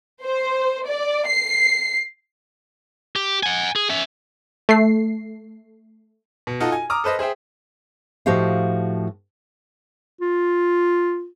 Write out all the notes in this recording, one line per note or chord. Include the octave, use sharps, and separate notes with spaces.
C5
D5
C7
G4
F#5 G#5
G#4
C#4 E5
A3 C7
B2
D#4 F4 F#4 A4
G#5
A#5 D6 D#6 F6
A4 B4 C5 D#5
G#4 C5 E5 G5
A2 F3 F#4 G4 D#5 F5
F4